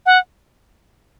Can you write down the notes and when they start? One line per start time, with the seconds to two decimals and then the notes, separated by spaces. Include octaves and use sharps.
0.06 F#5